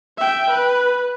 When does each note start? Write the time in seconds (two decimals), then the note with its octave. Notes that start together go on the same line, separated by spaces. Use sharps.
0.18 E5 G5
0.51 B4